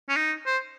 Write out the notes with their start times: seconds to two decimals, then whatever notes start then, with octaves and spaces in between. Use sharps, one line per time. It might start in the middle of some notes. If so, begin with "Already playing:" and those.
0.09 C#4
0.16 D#4
0.46 C5